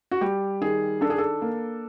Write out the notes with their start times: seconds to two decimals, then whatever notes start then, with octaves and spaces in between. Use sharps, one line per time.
0.11 F#4
0.21 G3 G4
0.61 D#3 G#4
1.01 D4 A4
1.10 G#4
1.18 A4
1.42 A#3